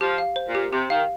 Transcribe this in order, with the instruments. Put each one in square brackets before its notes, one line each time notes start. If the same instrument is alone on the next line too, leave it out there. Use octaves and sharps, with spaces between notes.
[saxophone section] F3 [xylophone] G4
[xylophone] F5
C5
[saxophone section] A#2
[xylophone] G4
[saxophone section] C3 [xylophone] G4
[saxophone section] D#3 [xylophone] F5